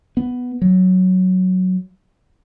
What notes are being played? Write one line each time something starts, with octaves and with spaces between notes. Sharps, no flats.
B3
F#3